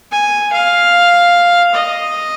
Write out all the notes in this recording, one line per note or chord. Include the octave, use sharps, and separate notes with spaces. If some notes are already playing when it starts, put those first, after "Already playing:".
G#5
F5
D#5